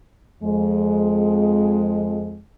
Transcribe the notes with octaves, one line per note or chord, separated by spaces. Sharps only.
F2 G#3